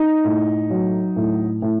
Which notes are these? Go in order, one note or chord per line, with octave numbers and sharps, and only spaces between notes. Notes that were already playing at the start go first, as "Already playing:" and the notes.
Already playing: D#4
A2
F#3
A2
A2